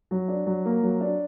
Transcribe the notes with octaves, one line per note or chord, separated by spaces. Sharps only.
F#3
D4
F#3
A#3
F#3
D4